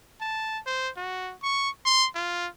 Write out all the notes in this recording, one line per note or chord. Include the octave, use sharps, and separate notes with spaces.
A5
C5
F#4
C#6
C6
F4